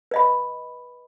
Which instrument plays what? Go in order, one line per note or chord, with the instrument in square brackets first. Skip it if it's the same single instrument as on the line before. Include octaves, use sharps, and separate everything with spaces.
[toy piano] B4 D#5 B5